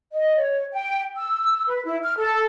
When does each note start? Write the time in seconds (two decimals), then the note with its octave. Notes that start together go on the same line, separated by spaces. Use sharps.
0.13 D#5
0.37 C#5
0.73 G5
1.16 E6
1.68 B4
1.85 E4
2.04 F6
2.18 A4